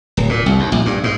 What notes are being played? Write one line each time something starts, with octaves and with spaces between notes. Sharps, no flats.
D1
A#2
C2
D#2
A#1
G2
G#2